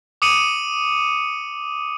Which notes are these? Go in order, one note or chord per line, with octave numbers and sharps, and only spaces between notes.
D6 D#6 C#7 D#7 F#7